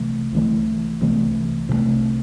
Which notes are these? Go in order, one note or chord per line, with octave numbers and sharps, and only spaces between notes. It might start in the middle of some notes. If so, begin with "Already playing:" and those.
Already playing: C2 C3 E3 A3
C2 C3 E3 A3
C2 C3 E3 A3
C2 C3 E3 A3